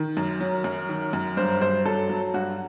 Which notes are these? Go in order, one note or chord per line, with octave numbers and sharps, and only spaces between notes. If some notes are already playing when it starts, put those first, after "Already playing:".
Already playing: D#3
F#2
F#3
F#2
D#3
F#2
G2 C5
G2 C5
F#3 A4
F#3
G2 F#4